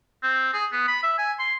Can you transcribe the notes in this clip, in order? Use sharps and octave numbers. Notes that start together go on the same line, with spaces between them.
C4
G#4
B3
B5
E5
G#5
C6